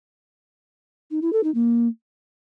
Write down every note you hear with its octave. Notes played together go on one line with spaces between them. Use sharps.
D#4
E4
A4
D#4
A#3